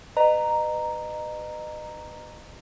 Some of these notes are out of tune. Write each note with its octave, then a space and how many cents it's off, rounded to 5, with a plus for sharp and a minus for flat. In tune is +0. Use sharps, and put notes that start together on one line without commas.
B4 +20 D#5 -30 A#5 +0